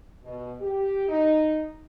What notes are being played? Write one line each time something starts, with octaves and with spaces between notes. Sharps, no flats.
B2
G4
D#4